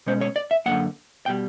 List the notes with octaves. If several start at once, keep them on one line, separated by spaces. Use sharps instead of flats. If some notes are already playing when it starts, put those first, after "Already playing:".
B2 G#3 C#4 C5
C#5
D5
E5
F#2 D3 F3 A#3 F#5
B2 G3 G5